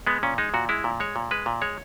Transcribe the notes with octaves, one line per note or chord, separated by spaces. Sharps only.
G#3 B3
A#2 C#4
G#3 D#4
A#2 F#4
G#3 E4
A#2
G#3 C#5
A#2
G#3 B4
A#2
G#3 C#5